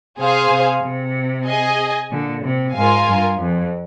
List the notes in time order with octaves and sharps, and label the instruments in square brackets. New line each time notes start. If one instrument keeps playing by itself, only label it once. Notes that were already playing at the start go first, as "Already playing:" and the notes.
[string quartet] C3 [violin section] G#4 C5 F5 G#5
[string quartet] C3
C3
[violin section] G#4 D#5 G#5
[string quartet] A#2 D3
C3
[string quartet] G#2 [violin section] F4 A#4 F5 G#5
[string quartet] G2
F2